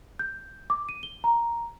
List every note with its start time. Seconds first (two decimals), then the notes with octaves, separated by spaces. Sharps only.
0.19 G6
0.70 D6
0.89 D#7
1.03 G7
1.24 A#5